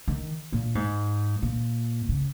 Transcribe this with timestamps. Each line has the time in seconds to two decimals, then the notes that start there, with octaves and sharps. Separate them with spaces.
0.08 D#3
0.52 A#2
0.75 G#2
1.42 A#2
2.09 C#3